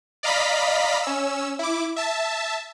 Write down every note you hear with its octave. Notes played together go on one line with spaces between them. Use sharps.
D5 D#5 F5 A#5 B5 B6
C#4 E6
E4 D6
E5 A5